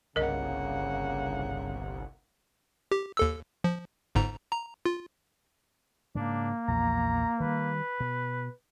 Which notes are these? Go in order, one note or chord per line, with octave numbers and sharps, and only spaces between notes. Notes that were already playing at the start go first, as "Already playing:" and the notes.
G1 C2 C#3 A#3 A#4 D#5 F#5
G4
D#2 A4 E6
F3
G1 G#2 A#5
A#5
F4
G#2 C#3 A#3 D4
A#1 E2 F3 A#5
D#3 G3 B4
B2